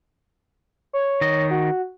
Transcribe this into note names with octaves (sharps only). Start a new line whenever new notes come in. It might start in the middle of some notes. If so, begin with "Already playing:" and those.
C#5
D#3 D#5
F#4